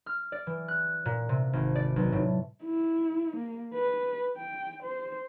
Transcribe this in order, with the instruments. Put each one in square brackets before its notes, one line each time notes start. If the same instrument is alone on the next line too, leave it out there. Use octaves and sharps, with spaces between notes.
[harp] F6
D5
E3
F#6
A#2
C3
G#1
D5
B1
A2
[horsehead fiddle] E4
A#3
B4
G5
C5